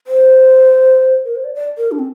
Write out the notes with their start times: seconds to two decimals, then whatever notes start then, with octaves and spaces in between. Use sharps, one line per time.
0.07 C5
1.25 A#4
1.36 C5
1.45 D5
1.55 D5
1.78 A#4
1.92 D4
1.99 C4